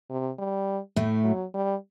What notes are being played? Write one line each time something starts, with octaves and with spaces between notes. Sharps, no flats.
C3
G3
A2 A3
F#3
G3